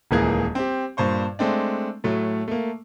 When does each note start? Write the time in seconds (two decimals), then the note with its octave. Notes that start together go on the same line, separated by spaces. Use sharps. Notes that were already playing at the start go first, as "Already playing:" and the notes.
0.11 D#1 C#2 E3 A#3 G#4 G#6
0.55 C4 G4
0.97 G2 A#2 C5 C#6
1.39 G#3 A3 C4 D4
2.04 A2 F#3 A3
2.48 A3 A#3